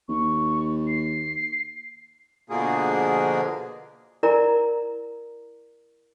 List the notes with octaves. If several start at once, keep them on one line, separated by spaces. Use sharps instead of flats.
D#2 C#6
C7
B2 D3 F3 A#3 G#4
E4 A#4 D5 G#5 A#5